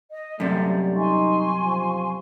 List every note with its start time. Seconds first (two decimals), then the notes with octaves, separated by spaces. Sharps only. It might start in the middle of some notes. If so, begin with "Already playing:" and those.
0.11 D#5
0.40 F#2 C3 G3 A3 D5
0.95 D#4 G#5 C6 C#6
1.62 F3